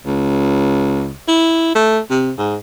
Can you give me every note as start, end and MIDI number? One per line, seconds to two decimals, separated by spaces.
0.06 1.13 37
1.28 1.72 64
1.75 1.99 57
2.10 2.31 48
2.38 2.56 44